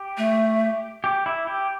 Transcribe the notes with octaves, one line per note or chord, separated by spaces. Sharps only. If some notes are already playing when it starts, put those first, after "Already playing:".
Already playing: G4
A3
G4
E4
G4